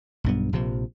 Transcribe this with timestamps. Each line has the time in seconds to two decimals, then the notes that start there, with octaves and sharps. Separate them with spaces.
0.24 B1 G2 B3
0.53 A#1 C3 F3